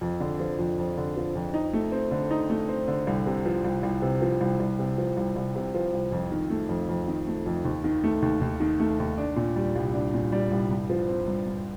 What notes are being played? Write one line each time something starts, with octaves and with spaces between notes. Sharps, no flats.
F2
D3
F3
F2
F2
D3
F3
F2
D#4
A3
C4
D3
D#4
A3
C4
D3
C2
C3
F3
C2
C2
C3
F3
C2
C2
C3
F3
C2
C2
C3
F3
C2
F2
D#3
A3
F2
F2
D#3
A3
F2
D#2
D#3
A3
D#2
D#2
D#3
A3
D#2
D4
A#2
G3
C2
D4
A#2
G3
C2
G2
F3
C4
G2
G2